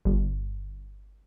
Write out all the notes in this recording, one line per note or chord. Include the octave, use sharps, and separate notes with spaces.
G1